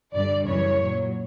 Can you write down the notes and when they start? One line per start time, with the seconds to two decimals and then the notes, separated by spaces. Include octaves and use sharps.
0.15 G2 D3 G3 D5
0.47 F#2 C#3 E3 G3 C#5
0.81 A#2 F#3